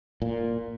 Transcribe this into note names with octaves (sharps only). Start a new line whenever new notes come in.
A#2